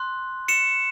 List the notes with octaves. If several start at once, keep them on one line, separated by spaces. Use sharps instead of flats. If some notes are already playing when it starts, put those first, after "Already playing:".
Already playing: C6 F#6
C#7 E7